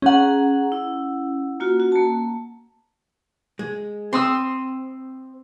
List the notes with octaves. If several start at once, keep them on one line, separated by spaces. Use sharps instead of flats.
C#4 G#4 F#5 A#5
E4
A#3 F4 F#4
F#4
A#3 A5
G#3
C4 C6 D#6 E6